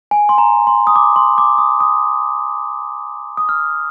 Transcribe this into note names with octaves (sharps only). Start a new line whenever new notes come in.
G#5
C6
A#5
C6
D#6
D6
C6
D6
D#6
D#6
D#6
F6